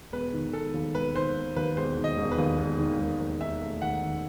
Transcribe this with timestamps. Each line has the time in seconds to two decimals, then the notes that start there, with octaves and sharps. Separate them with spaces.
0.12 E1 B4
0.33 D#3
0.53 E1 A4
0.74 D#2
0.95 E1 B4
1.15 D#3 C5
1.36 E1
1.56 D#2 B4
1.77 E1 C5
1.97 D#3
2.04 D#5
2.17 E1
2.31 B4
2.38 D#2
2.59 E1
2.79 D#3
3.00 E1
3.20 D#2
3.41 D#4 E5
3.62 A3
3.82 D#2 F#5
4.02 D#3